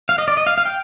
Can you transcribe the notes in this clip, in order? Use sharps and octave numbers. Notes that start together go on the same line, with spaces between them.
F5
D#5
D5
D#5
F5
F5
G5